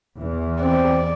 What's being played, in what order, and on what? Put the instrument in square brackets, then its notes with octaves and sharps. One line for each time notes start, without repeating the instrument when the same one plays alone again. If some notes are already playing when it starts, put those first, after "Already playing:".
[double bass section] E2 E3
[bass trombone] C4 [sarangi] D5